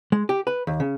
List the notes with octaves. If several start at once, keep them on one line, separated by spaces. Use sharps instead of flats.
G#3
G4
B4
D#2
C#3